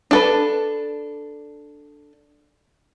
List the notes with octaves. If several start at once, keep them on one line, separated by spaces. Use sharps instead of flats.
D4 A4 B4